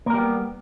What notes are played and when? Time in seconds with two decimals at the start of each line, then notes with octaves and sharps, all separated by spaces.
0.06 A#3
0.10 A#4
0.14 G3
0.18 B3